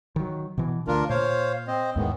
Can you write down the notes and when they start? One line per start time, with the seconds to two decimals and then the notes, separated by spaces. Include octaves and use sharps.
0.16 D#3 F#3
0.58 B2 E3
0.87 D2 D4 F4 A#4
1.10 A#2 C5 C#5 F5
1.67 C4 C5 D#5
1.96 D#2 G#2 D#3 E3 G#3 B3